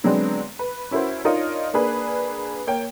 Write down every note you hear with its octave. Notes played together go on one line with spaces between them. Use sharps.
D3 F#3 G#3 B3 C4 D4
B4
C#4 E4 F#4 A#4 C5
D4 D#4 F4 A#4 C#5 D#5
A#3 D4 G#4 B4
A#3 C#5 G5